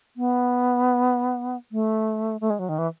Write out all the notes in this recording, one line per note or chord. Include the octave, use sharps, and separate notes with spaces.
B3
A3
A3
G#3
F#3
D#3
E3